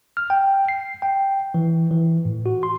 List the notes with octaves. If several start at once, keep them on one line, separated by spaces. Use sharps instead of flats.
F6
G5
C7
G5
E3
E3
A2
F#4
C6